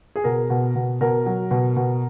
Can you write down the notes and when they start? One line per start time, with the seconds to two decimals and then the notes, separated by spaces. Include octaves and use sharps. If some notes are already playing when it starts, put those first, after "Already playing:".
0.16 G#4
0.24 B2 A#4
0.50 B2
0.75 B2
1.01 B2 A#4
1.26 F#3
1.51 B2
1.77 B2